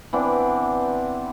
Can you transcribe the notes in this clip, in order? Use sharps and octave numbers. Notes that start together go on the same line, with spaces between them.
E3 B3 C4 D4